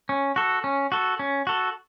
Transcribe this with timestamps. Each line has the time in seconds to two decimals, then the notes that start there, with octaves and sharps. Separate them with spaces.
0.09 C#4
0.36 F#4 A4
0.64 C#4
0.92 F#4 A4
1.19 C#4
1.47 F#4 A4